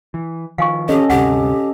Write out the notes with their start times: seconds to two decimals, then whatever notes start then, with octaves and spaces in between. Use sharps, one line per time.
0.14 E3
0.58 D#3 F3 F5 G#5 C#6
0.89 C#4 G4 A4 D#5
1.10 D2 G2 C3 G4 F#5